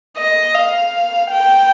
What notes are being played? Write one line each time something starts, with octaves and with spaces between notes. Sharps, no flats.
D#5
F5
G5